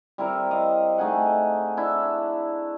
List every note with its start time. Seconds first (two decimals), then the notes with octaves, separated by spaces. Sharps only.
0.18 G3 C4 E4 A#4
0.51 D#5 F5
0.98 A3 D#4 G#4 F#5
1.77 D4 E4